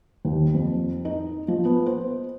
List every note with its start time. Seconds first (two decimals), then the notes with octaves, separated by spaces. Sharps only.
0.25 D#2
0.54 F2
1.05 D#4
1.48 F3
1.65 B3
1.86 C5